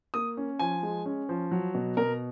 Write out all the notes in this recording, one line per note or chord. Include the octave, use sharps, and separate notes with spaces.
A#3 D#6
C#4
F3 G#5
G#3
C#4
F3
F#3
B2
B2 A#4